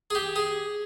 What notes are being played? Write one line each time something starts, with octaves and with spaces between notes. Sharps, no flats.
G#4
G4
G#4